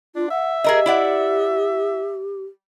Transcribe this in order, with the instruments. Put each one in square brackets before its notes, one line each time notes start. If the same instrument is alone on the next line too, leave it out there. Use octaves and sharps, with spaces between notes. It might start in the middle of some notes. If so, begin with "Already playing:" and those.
[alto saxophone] D4 [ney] F4
[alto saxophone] E5 [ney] F#5
[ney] G4 [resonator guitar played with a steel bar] G#4 A#4 D#5
[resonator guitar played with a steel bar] E4 D5 F#5